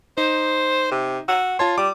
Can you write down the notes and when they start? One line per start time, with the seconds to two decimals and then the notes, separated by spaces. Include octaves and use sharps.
0.18 D#4 C5
0.91 C3
1.28 F#4 E6
1.59 F4 C#5 A5 C6
1.78 G3 D6